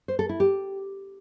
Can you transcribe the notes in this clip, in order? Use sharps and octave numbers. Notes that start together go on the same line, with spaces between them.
C5
A4
E4
G4